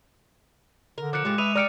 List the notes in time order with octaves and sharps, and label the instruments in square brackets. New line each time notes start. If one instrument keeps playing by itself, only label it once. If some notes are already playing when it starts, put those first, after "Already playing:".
[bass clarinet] D3 [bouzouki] A#4
[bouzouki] F3 A#3 [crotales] D6 F#6 C#7
[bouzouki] A2 F4 G4 [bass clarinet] G#3
[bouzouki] B4 E5 [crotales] D#6 D#7 F7
[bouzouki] G4 G5 A#5 [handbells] D5 F6 C#7